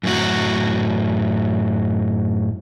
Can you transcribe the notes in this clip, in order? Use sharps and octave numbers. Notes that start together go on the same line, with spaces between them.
F#2 A2 F#4